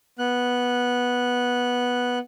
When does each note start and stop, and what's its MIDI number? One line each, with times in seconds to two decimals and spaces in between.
0.19 2.19 59
0.19 2.19 90